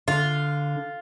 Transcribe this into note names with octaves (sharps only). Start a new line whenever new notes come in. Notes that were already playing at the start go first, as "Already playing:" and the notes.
D3 F4